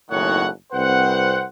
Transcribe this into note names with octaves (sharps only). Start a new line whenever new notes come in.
F#1 B1 A2 D#3 C#5 F#5
C2 C4 B4 C5 F#5